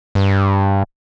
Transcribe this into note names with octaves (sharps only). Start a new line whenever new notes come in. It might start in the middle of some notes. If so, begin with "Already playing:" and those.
G2